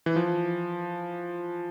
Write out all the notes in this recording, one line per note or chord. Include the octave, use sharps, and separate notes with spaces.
E3
F3